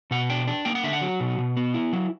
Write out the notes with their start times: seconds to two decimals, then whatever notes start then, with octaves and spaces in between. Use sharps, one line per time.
0.11 B2 F#5
0.30 D4 G5
0.47 D4
0.65 A#3 G5
0.75 F#5
0.84 D3 E5
0.93 F#5
1.02 F#3
1.20 B2
1.38 B2
1.57 B3
1.74 E4
1.93 F#3